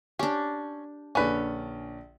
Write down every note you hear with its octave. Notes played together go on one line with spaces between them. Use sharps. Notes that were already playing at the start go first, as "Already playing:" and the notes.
C#4 D4 G4
A#1 D3 C#4 B4 D5